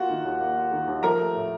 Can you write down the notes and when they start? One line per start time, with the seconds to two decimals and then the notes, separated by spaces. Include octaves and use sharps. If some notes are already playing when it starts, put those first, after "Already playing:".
Already playing: A#3 F4 F#4 F#5
0.10 D#3
0.25 D#2
0.40 A#3
0.56 F4
0.72 D#3
0.87 D#2
1.03 F3 A#4 A#5
1.19 A3
1.34 A2